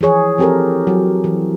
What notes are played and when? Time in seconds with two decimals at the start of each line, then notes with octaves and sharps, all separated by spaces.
0.01 E3 F3 G#4 C#5
0.38 F3 C4 G4 A4 A#4
0.87 F#3
1.24 E3